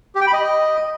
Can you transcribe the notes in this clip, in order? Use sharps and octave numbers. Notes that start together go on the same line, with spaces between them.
G4
G5
B5
D#5